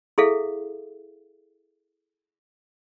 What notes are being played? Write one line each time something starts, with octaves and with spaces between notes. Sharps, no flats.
E4 G#4 A4 E5 F5